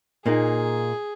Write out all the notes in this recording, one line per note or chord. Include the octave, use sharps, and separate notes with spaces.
A#2 A#3 D#4 G#4